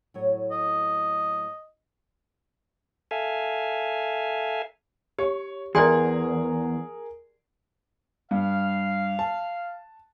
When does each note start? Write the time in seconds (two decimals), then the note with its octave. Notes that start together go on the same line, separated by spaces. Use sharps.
0.14 A2 F#3 C#5
0.51 D#5
3.11 A4 E5 F5 G#5
5.19 G4 C#5
5.75 E2 G#4 A#4 D5 G5 C6
8.31 G2 F5
9.19 A5